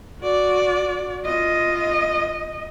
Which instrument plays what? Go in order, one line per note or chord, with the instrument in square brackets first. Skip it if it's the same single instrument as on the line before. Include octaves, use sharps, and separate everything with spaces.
[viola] F#4 D5
[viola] F4 [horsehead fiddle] D#5